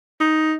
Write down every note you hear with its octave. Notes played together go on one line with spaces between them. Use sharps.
D#4